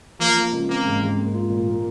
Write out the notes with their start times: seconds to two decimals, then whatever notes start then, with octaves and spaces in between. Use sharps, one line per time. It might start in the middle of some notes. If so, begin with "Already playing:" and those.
0.19 F3 A#3
0.37 A#3
0.52 C#2
0.69 A#3 C4
0.85 G#2
1.02 G#2
1.17 A#3
1.34 F4
1.50 A#2
1.68 A#3